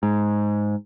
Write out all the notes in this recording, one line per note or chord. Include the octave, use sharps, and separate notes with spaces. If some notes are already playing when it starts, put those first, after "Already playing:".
G#2